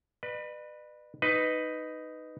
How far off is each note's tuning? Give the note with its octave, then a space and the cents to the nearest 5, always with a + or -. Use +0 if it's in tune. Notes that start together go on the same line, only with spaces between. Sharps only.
B4 -5 D5 +45
D#4 +0 B4 +10 D#5 +0